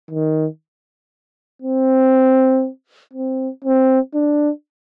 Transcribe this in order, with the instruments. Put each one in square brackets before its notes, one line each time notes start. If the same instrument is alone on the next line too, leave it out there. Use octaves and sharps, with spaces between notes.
[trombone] D#3
C4
C4
C4
D4